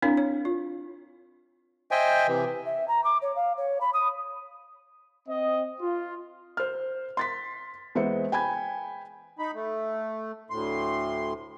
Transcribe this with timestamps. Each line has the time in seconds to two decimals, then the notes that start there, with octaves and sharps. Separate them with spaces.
0.02 C4 D4 E4 A#4 C#5 F5
0.17 C#5
0.45 F4
1.91 C5 D#5 E5 G5 G#5
2.27 C3 E3
2.66 E5
2.88 A#5
3.04 D6
3.22 C#5
3.36 F5
3.58 C#5
3.81 B5
3.94 D#6
5.28 C4 D#5
5.81 F4
6.57 C5 F6
7.17 C6 A6 B6
7.95 E2 G#3 B4 C5 E5 C#7
8.32 G5 G#5 B5 G#6
9.39 D#4 B5
9.55 A3
10.50 D2 A2 C6